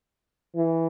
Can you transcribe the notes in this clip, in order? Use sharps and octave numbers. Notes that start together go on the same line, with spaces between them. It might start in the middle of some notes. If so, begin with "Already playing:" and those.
E3